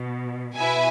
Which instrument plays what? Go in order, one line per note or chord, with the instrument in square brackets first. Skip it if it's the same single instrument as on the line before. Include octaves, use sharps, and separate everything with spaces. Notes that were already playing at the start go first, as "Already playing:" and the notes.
Already playing: [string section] B2
[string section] B2 [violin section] E4 B4 E5 G#5